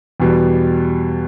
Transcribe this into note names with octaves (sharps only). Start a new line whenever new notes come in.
E2 B2 G3